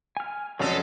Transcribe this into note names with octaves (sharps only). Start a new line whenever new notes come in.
G#5 F6
F1 C#3 F#3 G#3 C#4 A4